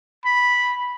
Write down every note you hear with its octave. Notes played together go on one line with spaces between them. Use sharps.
B5